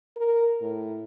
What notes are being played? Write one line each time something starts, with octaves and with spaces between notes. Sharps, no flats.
A#4
A2